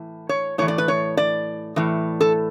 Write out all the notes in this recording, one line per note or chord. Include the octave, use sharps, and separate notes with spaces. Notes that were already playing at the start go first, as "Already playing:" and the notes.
Already playing: A2 E3
C#5
A2 E3 C#5
D5
B4
C#5
D5
A2 E3
A4